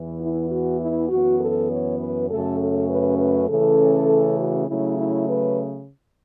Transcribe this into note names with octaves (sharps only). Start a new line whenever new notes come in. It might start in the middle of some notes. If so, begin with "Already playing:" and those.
Already playing: E2 E3 B3
E4
F#4
E4
F#2 E3 B3 F#4
A4
C#5
B4
F#2 C#3 A3 C#4 A4
A4
B4
B4
C#3 E3 A3 C#4 A4
F#4
C#3 F#3 A3 E4
E4
B4